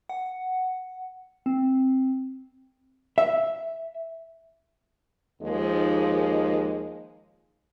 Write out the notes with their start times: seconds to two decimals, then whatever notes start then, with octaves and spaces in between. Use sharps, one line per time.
0.09 F#5
1.46 C4
3.18 E5
5.42 D#2 F3 G#3 D#4